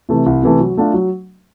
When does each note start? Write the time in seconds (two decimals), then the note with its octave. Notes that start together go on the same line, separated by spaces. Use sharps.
0.09 C3 E3 A3
0.26 C2
0.43 C3 E3 A3
0.60 F#3
0.77 A3 D4 F4
0.94 F#3